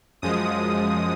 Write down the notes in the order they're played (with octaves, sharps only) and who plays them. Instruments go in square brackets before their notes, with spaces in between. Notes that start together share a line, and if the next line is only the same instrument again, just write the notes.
[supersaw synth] F#2 F3 G#3 D#6